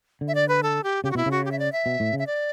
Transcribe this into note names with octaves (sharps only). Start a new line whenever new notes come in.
D3
E5
D5
B4
A4
G4
C#3 G4
F#4
B2 E4
C#3
F#4
G4
E5
D5
E5
B2
A2
C#3
E5
D5